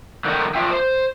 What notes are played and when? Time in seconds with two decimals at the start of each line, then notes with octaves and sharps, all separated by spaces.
0.25 D3 D#3 G3 A3 D#4
0.55 D4 F4 E5 G5
0.71 C5